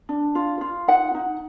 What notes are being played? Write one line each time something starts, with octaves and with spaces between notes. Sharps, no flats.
D4
F4
F4
D#4 F#5
D#4